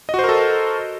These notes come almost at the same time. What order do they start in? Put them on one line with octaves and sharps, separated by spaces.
D#5 F#4 C5 A#4 A4